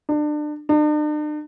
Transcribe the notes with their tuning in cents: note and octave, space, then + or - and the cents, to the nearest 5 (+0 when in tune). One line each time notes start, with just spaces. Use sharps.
D4 +30
D4 +45